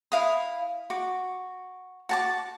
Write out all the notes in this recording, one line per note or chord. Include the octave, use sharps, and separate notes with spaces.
E4 F5 D#6
F#4 D6
F#4 A5 D6